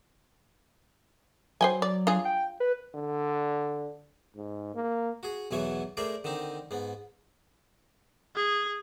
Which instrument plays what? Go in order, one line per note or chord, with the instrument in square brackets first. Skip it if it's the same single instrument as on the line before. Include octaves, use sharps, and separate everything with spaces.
[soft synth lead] F#3 [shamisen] C5 G5 G#5
[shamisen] D5
D4 F4 G#4
[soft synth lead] G5
B4
[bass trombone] D3
G#2
A#3
[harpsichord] F#4 G#4
B1 E2 B2 E3 F#3 C#5
A3 G#4 A#4 C5 D5
D3 D#3 C4 D#4
G#2 B3
[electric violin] G#4